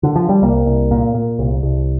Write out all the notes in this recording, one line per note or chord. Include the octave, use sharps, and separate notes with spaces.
D3
F3
G3
C2 A#3
C2
A#2
A#2
C2
C2